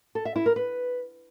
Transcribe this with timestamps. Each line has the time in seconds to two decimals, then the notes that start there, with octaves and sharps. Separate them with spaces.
0.15 A4
0.25 E5
0.36 E4
0.46 A#4
0.56 B4